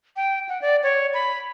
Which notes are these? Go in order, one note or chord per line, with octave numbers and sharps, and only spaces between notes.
G5
F#5
D5
C#5
B5